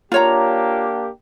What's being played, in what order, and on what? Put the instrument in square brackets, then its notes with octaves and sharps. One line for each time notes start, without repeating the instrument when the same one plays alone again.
[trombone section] A#3 D4 G4 [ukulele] F4 C#5 A#5